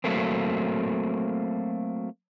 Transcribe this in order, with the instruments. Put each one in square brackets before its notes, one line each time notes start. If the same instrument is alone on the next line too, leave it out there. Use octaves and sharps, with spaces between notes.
[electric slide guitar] F#3 A3 A#3 C4